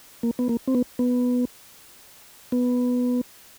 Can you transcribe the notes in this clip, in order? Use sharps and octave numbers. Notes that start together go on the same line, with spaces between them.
A#3
B3
A#3
C4
B3
B3
B3